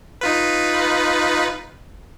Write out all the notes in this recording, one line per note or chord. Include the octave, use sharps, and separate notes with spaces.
D#4 F4 B4